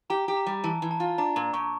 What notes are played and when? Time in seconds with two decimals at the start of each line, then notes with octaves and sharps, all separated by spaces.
0.10 G4 A#5
0.28 G4
0.37 A#5
0.46 G3
0.64 E3 A5
0.82 E3
0.91 A5
1.00 F4
1.18 D4 A#5
1.36 A#2 A#5
1.53 A#2 C#6